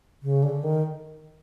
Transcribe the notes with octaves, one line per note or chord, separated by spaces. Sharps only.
C#3
D3
D#3